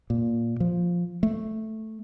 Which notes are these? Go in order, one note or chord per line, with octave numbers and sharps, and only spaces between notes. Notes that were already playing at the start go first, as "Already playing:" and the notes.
A#2
F3
A3